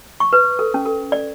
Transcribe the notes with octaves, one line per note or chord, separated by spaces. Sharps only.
C#6
B4
A4
C#4
A4
D5